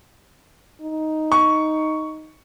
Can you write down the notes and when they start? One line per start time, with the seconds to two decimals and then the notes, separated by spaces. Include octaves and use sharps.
0.82 D#4
1.32 C#6